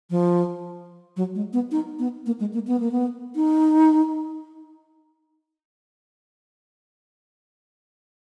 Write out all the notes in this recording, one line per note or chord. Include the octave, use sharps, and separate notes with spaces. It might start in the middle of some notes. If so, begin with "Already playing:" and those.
F3
F#3
G#3
B3
D#4
B3
A#3
G#3
A#3
B3
A#3
B3
D#4